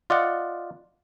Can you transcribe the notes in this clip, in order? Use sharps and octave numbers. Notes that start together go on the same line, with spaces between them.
F4 D5 D#5 F#5